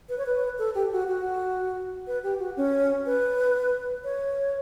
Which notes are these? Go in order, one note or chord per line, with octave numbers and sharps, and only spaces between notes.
B4
C#5
B4
A4
G4
F#4
F#4
B4
G4
F#4
C#4
B4
C#5